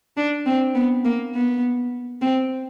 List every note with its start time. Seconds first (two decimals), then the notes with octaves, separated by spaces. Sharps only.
0.17 D4
0.46 C4
0.75 B3
1.05 A#3
1.34 B3
2.22 C4